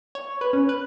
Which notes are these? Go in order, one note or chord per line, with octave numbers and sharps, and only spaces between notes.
C#5
B4
C#4
B4